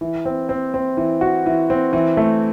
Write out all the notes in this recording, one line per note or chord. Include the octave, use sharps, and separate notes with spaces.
E3
C4
C4
C4
E3
F#4
E3
C4
E3
A3